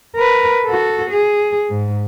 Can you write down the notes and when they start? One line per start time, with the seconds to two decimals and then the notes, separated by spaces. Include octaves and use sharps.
0.16 A#4 B4
0.66 F#4 A4
1.11 G#4
1.69 G#2